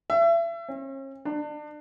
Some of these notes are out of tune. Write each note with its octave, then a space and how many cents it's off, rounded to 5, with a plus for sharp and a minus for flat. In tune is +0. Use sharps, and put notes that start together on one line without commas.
E5 +35
C#4 -40
D4 +35